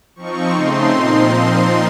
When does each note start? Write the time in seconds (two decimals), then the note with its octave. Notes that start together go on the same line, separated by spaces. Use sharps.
0.16 F3 C4 D#4 C#6
0.53 C#3 A3 C4 D#4 C6
0.89 A#2 F3 C4 D#4